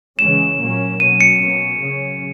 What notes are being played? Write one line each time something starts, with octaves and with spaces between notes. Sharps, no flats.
C#3 E3 G#3 C#4 E7
A#2 F#3 A#3 C#4
B2 F#3 C#4 D#7
C#7
B2 A#3 C#4
C#3 F#3 C#4